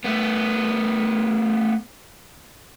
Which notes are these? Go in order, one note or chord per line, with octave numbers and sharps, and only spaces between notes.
A3 B3